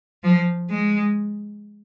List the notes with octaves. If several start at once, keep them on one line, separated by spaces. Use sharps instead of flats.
F3
G#3